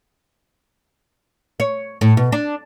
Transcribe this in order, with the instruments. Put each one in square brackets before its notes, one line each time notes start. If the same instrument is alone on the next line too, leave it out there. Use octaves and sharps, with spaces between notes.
[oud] C#5
A2
B2
D4